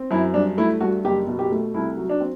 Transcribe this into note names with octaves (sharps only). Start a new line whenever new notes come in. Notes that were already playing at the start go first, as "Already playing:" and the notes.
Already playing: C4
F#2 E4
G2 D4
A3 E4
G2 F#4
F#1 G4
B2
G4
A3
C2 E4
F#3
D4
C4